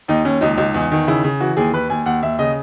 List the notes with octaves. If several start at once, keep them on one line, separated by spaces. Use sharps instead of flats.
D#2 D#4
D#2 C#4
C#2 D#4
C#2
E2
D#3
C#3 E4
C#3
E3 F#4
D#2 G#4
D#2 B4
D#2 G#5
D#2 F#5
D#2 E5
C#3 D#5